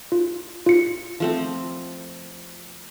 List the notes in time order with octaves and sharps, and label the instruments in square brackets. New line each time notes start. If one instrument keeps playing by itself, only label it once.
[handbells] F4
F4 C#7
[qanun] F3 A3 C4